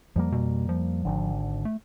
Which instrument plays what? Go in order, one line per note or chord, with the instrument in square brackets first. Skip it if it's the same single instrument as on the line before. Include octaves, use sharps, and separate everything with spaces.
[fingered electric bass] F2 G3 A#3 [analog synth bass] F3
[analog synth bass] B2
F3
[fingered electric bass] G#1 D3
[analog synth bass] A3